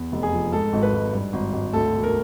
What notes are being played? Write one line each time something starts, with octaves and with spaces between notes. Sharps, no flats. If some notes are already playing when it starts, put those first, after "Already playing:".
Already playing: E2
F1
G#4
F3
G#2 A4
G#1
B4
G#1
G2
G#1
G#1
D2 A4
E1
A#4